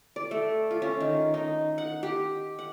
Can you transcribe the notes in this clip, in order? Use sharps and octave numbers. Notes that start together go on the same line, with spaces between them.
D5
A3
F4
C#4
D#3
D#4
F#5
G4
F#5